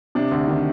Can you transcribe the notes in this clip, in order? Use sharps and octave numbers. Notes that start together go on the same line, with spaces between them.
C3 D4
D2
D#3